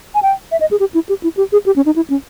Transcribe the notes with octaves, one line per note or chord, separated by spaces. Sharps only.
G#5
G5
E5
D#5
G#4
G4
E4
G4
E4
G4
G#4
G4
C#4
D#4
E4
C#4